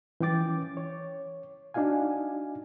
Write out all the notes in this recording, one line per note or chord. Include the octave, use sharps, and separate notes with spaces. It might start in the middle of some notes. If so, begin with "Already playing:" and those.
E3 C#4 G5 D6 A6
C#5
D4 D#4 F#4 F5 G#5